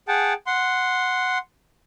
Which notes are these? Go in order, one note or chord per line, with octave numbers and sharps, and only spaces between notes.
G#4 F#5 G5 A5
F#5 C6